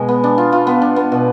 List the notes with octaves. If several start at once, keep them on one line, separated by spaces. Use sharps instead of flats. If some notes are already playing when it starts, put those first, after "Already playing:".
Already playing: B2 G#3
B3
D4
F4
F4
B3
D4
B3
B2